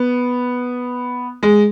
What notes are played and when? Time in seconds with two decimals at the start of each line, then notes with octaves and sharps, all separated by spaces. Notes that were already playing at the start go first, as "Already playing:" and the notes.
Already playing: B3
1.43 G#3